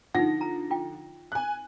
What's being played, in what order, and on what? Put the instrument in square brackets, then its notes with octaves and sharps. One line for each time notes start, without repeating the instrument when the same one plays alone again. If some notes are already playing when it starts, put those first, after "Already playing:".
[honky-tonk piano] D3 F3 A#6 [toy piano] D#4 F#5
[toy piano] A#5
F4 G5
[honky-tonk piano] G#5 F#6